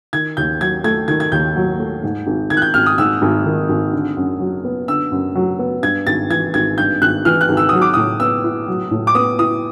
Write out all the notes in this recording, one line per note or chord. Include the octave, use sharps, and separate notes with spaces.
D#3 G#6
D#2 G6
F#3 G#6
A3 G#6
D#3 G#6
G#6
D#2 G6
F#3
A3
G#2
G#1
D#3 G#6
F#6
G6
G#1 F6
D#6
G#2 E6
G#1
D#3
G#1
D3
F#2
F#3
B3
D3 E6
F#2
F#3
B3
G2 G#6
G#1 A6
E3 G#6
G#1 G#6
G2 G6
G#1 F#6
E3 F6
F#6
G#1
E6
F#3 D#6
D6
A2 D#6
B3 E6
E4
F#3
A2
D6
B3 D#6
E4 D#6